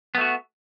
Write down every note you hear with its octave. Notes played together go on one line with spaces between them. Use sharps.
A3 B3 F#4